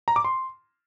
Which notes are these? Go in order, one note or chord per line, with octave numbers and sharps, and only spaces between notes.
A#5
D6
C6